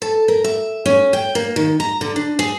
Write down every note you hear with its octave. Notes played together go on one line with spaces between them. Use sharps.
A4
A#4
E5
C#4
G5
A#3
D#3
A#5
D3
D4
G#4